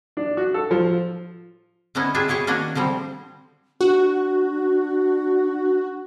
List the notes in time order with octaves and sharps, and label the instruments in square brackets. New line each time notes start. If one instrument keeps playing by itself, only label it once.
[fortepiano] D4
F#4
A4
F3
[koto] D3 G3 B3 C#4 D#4 E4
D4 F4 G4 G#4 E5
E4 G4 G#4 C#5
D#3 A#3 D4 F#4 A#4 G#5
D3 F3 G3 C4
[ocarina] D4 [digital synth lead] F#4